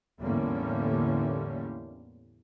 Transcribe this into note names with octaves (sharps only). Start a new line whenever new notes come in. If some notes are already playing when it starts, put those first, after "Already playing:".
E2 A2 D3 G3 A#3 C#4